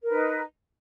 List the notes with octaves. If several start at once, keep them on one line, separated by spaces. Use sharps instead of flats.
D#4 A#4 B4